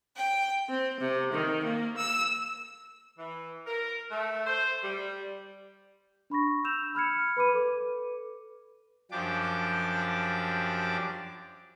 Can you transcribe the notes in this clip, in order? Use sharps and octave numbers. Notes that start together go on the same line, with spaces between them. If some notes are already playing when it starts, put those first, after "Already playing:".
G5
C4
C3
D#3
A#3
E6
E3
A#4
A3
C5
G3
D4 B5 C#6 A#6
E6 G6 E7 F7
B5 F6 G#6 C#7
B4 B5 D6 D#7
A4 B4 D6
F#2 F3 D4 G4 D6